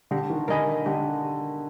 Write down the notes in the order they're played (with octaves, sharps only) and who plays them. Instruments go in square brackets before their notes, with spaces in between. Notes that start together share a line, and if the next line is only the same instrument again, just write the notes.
[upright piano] D3 [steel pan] G4
[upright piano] D#3
[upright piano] D3 [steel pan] A#4 D#5 G#5 B5
[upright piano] D3 [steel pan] G4